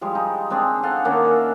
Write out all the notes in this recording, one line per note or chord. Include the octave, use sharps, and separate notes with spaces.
F3 G3 G#3
D#4
G#3 C4 D4 G#4
A4 F5 F#5 G#5
D#3 A#3 C#4 D4
E5